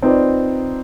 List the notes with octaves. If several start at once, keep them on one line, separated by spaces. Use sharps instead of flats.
C4 D#4 F4 B4 C5 D5